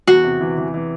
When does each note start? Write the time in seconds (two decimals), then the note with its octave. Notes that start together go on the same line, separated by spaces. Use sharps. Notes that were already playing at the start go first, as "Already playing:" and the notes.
0.07 E2 F#4
0.24 C3
0.41 E3
0.57 E3
0.74 E3